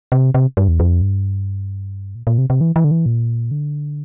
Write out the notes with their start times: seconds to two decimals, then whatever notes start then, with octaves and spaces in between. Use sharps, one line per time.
0.12 C3
0.34 C3
0.57 G2
0.68 E2
0.80 F2
1.02 G2
2.15 A#2
2.27 A#2
2.38 C3
2.50 C3
2.61 E3
2.76 E3
2.84 D3
2.91 E3
3.06 A#2
3.51 D3